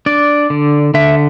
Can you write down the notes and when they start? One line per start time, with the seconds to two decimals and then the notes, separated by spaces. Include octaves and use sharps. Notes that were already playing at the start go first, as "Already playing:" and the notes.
0.06 D4 D5
0.50 D3
0.94 D3 E5